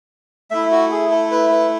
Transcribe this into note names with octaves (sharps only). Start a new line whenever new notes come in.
A3 E4 E5
F#4
G#4
A4
B4
B4